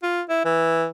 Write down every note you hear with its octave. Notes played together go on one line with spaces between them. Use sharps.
F4
E4
E3